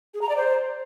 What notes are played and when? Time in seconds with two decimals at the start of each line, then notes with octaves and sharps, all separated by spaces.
0.14 G#4
0.22 A#5
0.29 D5
0.37 C5